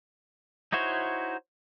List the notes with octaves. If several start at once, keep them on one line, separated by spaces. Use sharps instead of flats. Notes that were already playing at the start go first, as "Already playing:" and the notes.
D#4 E4 F#4 C5 C#5